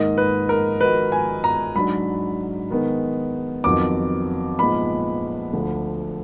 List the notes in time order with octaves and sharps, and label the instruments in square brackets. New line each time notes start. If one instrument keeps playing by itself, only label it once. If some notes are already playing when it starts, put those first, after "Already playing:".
Already playing: [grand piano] G#2 D#3 A#3 [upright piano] D#5
[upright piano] B4
A#4
[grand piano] D#3 G#3 D#4 F#4 A#4 [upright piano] B4
[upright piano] G#5
A#5
[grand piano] G#2 F#3 D4 [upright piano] B5
[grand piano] D#3 G#3 B3
[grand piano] F2 D#3 F#3 B3 [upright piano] D6
[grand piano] A#2 F3 G#3 B3 D#4 [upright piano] B5
[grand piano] D2 D3 F3